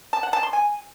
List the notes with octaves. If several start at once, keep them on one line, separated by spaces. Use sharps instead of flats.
A5
F#5
A5
C6
G#5